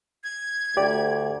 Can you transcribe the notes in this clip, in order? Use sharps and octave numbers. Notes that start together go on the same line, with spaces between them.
G#6
D2 G4 D5